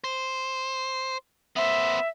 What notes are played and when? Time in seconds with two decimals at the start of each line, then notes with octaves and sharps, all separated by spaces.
0.04 C5
1.56 B3 C5 E5